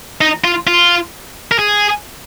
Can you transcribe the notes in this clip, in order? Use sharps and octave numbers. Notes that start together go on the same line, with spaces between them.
D#4
F4
F4
A#4
G#4